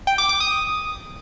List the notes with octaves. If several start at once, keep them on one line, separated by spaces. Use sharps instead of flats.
G5
D6
D6
D#6